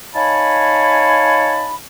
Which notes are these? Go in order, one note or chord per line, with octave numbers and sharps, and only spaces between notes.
D#4 C#5 F5 G#5 A5 B5